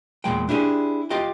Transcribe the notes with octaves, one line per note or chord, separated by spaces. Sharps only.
E2 A#2 G#3 G5
D4 E4 G4 G#4
F4 G4 D#5 F5 G5